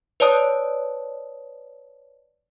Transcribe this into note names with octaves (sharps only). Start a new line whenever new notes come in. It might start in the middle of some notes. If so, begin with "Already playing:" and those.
B4 C#5 D5 A5 D#6